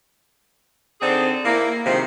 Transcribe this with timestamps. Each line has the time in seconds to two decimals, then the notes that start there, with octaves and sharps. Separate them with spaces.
1.01 D3 C4 D#4 G#4 C5 D5
1.44 A#3 E4
1.86 C3 D#3 F3 G#3 C4